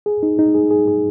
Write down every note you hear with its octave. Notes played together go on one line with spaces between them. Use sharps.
G#4
D#4
D#4
G#4
G#4
G#4